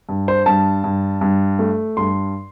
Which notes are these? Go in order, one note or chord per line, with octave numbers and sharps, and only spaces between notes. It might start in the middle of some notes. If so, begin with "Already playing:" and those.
G2
C5
G2 A5
G2
G2
A3
G2 C6